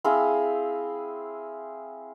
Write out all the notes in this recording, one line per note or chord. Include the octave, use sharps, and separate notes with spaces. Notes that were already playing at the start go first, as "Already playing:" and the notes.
C4 E4 G#4 F5